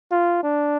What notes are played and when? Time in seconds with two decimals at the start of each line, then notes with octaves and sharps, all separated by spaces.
0.12 F4
0.43 D4